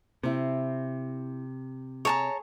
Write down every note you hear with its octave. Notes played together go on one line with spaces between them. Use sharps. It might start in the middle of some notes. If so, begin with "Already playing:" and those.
C3 C4 E4
G#4 C#5 A5 A#5